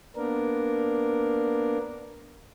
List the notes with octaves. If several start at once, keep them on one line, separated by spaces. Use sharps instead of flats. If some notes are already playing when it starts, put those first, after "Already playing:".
A#3 B3 D4 A#4